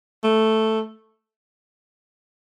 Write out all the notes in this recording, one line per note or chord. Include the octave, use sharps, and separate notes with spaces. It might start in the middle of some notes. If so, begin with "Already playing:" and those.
A3